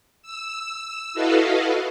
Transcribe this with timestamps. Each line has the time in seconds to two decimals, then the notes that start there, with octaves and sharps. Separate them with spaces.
0.22 E6
1.14 E4 F#4 A4 B4 D#5 F5